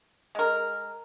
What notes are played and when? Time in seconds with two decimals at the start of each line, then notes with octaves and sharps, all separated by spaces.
0.35 G#3 A#4